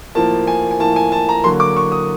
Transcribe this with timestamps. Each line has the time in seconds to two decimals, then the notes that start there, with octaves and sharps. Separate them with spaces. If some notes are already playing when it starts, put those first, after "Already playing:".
0.15 A2 F3 A#3 A5
0.47 G#5
0.71 G#5
0.80 A2 F3 A#3 A5
0.96 G#5
1.12 A5
1.29 A#5
1.44 D3 F#3 A#3 C6
1.60 D6
1.77 C#6
1.92 D#6